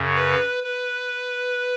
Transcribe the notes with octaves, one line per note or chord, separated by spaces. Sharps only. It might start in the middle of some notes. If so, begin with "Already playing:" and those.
Already playing: F#2 C#3
B4
B4